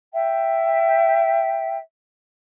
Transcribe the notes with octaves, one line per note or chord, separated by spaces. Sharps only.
E5 G5